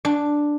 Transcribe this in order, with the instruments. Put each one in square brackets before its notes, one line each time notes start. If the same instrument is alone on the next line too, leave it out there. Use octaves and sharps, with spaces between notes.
[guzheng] D4